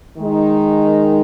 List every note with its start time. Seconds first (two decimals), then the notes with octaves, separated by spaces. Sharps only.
0.18 D#3 G#3 D#4